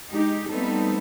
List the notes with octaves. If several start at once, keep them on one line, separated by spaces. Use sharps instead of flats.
G#3 D#4 G4
G3 A3 B3 C4 D#4 A4